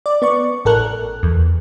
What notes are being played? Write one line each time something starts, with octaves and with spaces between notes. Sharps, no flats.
D5
B3 D5 C#6
A1 A4 A#4 F#6
E2